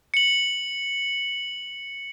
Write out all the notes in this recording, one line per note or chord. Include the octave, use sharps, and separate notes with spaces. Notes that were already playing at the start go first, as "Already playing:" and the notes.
C#7 F#7